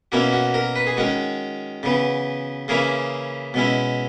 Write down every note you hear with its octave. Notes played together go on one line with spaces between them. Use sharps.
B2 A#3 C#4 E4 F#4
F#4
A#4
B4
G#4
D#3 G#3 C#4 F#4
C#3 E3 B3
C#3 E3 A#3 C#4 E4 G#4
B2 G#3 C#4 E4